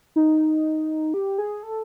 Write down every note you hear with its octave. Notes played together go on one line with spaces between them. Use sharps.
D#4
G4
G#4
A4